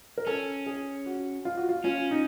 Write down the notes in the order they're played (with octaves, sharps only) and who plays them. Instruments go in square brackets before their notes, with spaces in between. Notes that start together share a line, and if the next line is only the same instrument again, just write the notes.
[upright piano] A#4
[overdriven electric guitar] C#4 [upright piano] A4
[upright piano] G#4
F#4
F4
F#4
F4
[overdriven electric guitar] C#4 [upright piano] F4
[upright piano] D#4